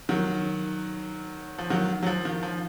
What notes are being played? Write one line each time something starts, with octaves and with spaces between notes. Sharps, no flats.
D#3 F#3
F3
D#3 F#3
F#3
F3
D#3
F3